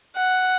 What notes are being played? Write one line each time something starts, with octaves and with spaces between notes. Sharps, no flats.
F#5